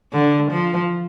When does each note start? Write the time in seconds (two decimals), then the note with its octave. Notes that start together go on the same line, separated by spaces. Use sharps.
0.13 D3
0.51 F3